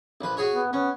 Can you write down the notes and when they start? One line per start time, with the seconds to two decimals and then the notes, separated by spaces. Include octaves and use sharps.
0.21 A#1 B4
0.37 F#4 G#4 C#5
0.53 B3
0.73 B3 C#4